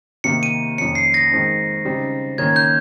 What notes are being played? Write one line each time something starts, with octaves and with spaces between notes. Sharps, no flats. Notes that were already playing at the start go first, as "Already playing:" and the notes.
C3 D#3 A#3 D#4 C#7
D#7
F2 D#3 A#3 C#4 C#7
C7
A#6
D#3 G#3 C4 D#4
C#3 G3 C4 D#4
D#3 A#3 C#4 G#6
G6